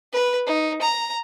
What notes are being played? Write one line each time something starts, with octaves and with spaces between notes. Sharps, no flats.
B4
D#4
A#5